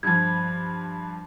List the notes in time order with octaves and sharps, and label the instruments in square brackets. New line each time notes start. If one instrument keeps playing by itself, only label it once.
[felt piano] G2 F3 [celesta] G#6